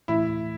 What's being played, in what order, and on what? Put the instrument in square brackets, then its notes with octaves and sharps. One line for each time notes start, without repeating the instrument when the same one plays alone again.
[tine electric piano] A2 E3 A3 [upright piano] E4